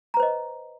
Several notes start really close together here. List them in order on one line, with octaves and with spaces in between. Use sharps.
A#5 B4 C5 D#5